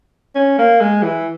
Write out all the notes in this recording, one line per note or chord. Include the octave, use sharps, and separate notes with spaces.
C#4
A#3
G#3
E3